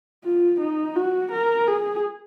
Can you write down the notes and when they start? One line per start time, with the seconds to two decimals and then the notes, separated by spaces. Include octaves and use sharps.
0.24 F4
0.60 D#4
0.95 F#4
1.31 A#4
1.67 G#4